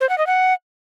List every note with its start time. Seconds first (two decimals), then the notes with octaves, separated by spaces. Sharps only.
0.01 C5
0.09 F#5
0.18 D#5
0.27 F#5